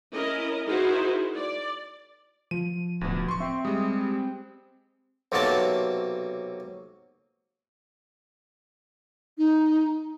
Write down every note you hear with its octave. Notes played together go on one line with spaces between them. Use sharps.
C#4 E4 A#4 D#5
D#4 E4 F#4 G#4 A#4 C5
D5
F3 D#7
D1 D2 B2
C6 C#6
C4 E5
G3 G#3 D#6
B1 C3 F#3 A#3 A5 D6
D#4